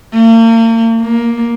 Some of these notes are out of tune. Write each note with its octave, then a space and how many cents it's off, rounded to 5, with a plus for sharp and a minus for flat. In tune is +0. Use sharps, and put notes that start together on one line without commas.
A#3 -40
A#3 +10